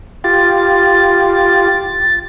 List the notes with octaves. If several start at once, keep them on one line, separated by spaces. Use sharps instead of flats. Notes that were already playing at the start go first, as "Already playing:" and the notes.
F4 G4 A6